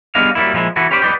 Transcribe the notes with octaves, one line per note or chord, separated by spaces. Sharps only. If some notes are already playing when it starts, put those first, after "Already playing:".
G3 B3 D4 G#4 D#5 F5
F#3 G3 A#3 E4
A#2 F3 G#3 E4
E3 E4 F#4 A4
C#4 G4 B4 C5 D5
B4 C5 D5 D#5 G5